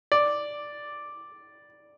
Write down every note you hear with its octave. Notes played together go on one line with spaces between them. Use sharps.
D5